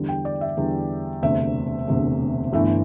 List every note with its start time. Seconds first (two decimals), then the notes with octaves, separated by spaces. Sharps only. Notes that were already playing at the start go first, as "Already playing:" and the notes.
Already playing: E2 D3 G3
0.09 G5
0.25 D5
0.41 E5
0.57 E2 D3 G3
1.22 E1 D2 C3 A3 E5
1.88 E1 D2 C3 A3
2.53 G1 G2 E3 A3 E5